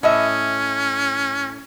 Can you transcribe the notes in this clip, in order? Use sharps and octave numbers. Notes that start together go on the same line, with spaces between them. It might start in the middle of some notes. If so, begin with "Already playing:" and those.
A2 C#4 D#5 E5